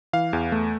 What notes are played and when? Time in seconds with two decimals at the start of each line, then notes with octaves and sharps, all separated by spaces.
0.13 E3 F5
0.33 E2
0.52 A3